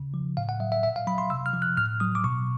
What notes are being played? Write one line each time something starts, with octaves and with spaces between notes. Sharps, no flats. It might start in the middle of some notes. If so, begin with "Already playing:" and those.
Already playing: C#3
F3
A2 F5
F#5
F#3 E5
E5
A#2 E5
F5
F#3 B5
C6
C3 E6
F6
F3
F#6
A2 F6
F#3 D#6
D6
B2 C#6